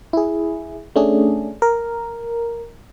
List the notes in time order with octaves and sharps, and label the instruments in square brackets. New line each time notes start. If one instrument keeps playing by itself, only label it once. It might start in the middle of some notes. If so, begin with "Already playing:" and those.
[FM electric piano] E4 G#4
A3 C#4 D4 G#4
A#4